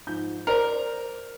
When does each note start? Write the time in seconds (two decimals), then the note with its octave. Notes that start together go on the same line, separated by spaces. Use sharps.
0.07 G#2 F3 G6
0.47 A#4 C5 D5 F6